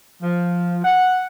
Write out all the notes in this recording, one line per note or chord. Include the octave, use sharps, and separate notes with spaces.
F3
F#5